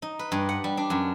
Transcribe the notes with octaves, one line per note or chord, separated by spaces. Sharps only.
D#4
B4
G2
F#5
G3
D4
F#2